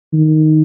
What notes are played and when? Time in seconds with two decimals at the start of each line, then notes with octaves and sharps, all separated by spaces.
0.13 D#3